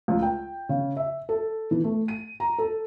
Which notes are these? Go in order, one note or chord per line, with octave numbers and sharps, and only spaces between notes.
C#2
G5
C#3
E5
A4
E3
A3
D#7
A#5
A4